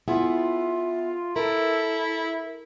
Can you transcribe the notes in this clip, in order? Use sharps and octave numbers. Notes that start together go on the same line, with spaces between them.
B3 E4 F4 G#4
E4 A4 A#4